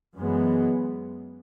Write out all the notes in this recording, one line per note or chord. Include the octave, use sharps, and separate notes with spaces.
F#2 E3 G#3 B3